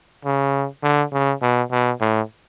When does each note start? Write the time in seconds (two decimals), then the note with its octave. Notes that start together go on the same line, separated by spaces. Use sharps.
0.25 C#3
0.83 D3
1.12 C#3
1.42 B2
1.71 B2
2.00 A2